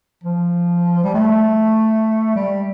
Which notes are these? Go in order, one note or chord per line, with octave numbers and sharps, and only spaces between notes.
F3
G3
A3
G3